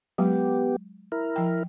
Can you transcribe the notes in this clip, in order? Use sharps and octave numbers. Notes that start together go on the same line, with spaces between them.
F#3 G#3 B3 G4
E4 A#4
F3 G5